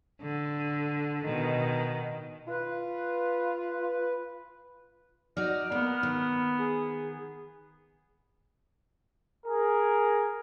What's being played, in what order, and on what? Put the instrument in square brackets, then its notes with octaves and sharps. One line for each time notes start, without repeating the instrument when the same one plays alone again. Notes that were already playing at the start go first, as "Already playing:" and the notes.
[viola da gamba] D3
B2 D#3
[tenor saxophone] F4 [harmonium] B4
[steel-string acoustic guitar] D#4 F#4 D5 [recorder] F6
[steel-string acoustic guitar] A#3 [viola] B3
[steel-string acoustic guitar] D#3
[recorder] G#4
[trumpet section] G#4 A#4